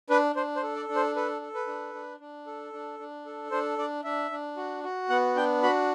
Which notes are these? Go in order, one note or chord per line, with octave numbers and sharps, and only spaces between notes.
D4 B4
D4 C5
C5
A4
D5
D4
C5
A4 B4
A4
B4
D4
D4
D4
A4
D4
D4
A4
D4 C5
D4 D5
D4 E5
D4
F#4
F#4
B3 F#5
D4 G5
F#4 B5